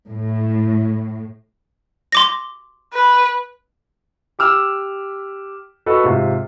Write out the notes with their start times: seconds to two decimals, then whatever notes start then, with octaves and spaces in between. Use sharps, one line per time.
0.10 A2
2.12 C6 D6 A#6
2.94 B4
4.39 G4 D6 E6 F6
5.86 F#4 A4 B4 D#5
6.04 G#2 C3 F4